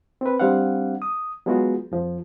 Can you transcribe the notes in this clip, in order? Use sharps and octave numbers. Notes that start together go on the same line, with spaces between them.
C4 B4
G3 C4 D4 F5 F#5
D#6
F#3 G#3 B3 F4 F#4 G#4
F2 F3